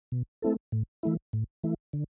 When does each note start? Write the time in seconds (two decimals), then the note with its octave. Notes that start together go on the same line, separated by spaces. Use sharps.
0.12 B2
0.42 A3 C4 E4 A4
0.72 A2
1.03 E3 A3 E4
1.33 A2
1.64 E3 A3 E4
1.93 D3